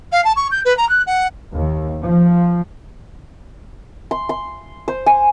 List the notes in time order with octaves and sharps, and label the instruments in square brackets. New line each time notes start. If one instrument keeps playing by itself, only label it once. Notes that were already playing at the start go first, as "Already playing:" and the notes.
[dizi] F5
A5
C#6
G6
B4
A#5
F#6
F#5
[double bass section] D#2
F3
[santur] C6
C6
C5
G#5